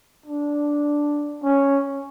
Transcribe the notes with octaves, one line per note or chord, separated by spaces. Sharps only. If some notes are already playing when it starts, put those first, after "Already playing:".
D4
C#4